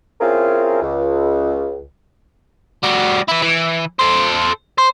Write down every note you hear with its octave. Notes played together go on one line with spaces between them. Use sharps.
C4 C#4 E4 F4 G#4 A#4
C#2
G3 F#4
E4 B4
E3
A4 C5
C5